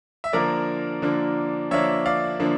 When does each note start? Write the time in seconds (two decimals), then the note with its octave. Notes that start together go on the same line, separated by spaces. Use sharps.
0.24 E5
0.33 D3 F3 A#3 D4 A#4 D5
1.02 D3 F3 A#3 D4
1.71 D3 F3 A#3 D4 C#5 E5
2.06 D5 F5
2.40 D3 F3 A#3 D4